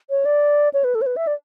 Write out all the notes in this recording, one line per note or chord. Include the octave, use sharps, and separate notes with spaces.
C#5
D5
C#5
B4
A4
C#5
B4
E5
D5